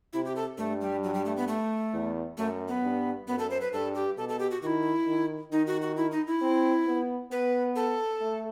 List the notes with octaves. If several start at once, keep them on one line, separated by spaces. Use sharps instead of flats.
C3 E4
G4
A4
G2 A3
G3
F#3
G3
A3
B3
A3
E2
F#2 A3
B3
G2
F#2 B3
A4
C5
B4
G2 A4
G4
B2 A4
A4
G4
F#4
D#3 E4 F#4
D#3
D#3 D#4
F#4
F#4
E4
D#4
E4
C4
B3
B3 B4
A4
A3